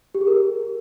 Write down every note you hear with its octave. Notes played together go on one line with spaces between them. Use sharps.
G4
G#4
A#4